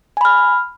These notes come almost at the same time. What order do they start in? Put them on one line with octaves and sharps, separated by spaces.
G#5 B5 F6